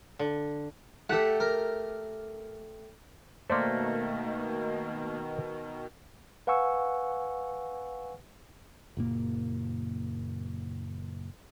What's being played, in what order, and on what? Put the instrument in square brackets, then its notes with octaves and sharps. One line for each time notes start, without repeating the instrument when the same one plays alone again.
[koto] D3
[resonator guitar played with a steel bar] A3 G4 [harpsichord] A4 F#5
[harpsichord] A#4
[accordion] B2 D#3 [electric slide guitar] A3 A#3 [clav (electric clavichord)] C5 D5
[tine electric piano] B4 F5 F#5 G#5 C#6 E6
[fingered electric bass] F#1 A#2 A#3